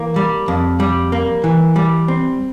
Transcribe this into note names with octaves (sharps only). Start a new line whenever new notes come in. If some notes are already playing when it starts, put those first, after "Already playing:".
Already playing: E3 A#3
G3
F2
G3
A#3
E3
G3
C4